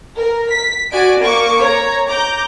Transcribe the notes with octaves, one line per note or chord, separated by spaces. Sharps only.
A#4
B6
F#4 D5 G#5 D7
A#3 C#6 D6
C#5 A#5
A#5 D6 G6